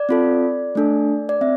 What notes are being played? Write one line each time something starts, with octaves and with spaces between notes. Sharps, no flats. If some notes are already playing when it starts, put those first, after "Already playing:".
Already playing: D5
C4 F4 A4
A3 D4 A4
D5
C4 E5